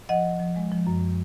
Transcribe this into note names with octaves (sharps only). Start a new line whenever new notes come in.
F3 D#5 F#5
F3
F3
G#3
F3
F#2